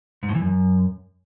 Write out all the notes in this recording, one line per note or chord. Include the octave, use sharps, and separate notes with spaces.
G#2
A2
E3
F#2